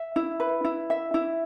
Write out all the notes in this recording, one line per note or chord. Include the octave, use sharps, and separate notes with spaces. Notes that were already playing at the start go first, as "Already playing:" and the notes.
Already playing: E5
E4
B4
E4
E5
E4